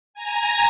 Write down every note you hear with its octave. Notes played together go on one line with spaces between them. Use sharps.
G#5 A#5